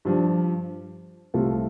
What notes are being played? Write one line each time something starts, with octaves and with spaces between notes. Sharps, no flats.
G2 F3 D4
C2 C3 A3 F4 A4